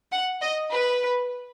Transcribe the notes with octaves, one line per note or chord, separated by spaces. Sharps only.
F#5
D#5
B4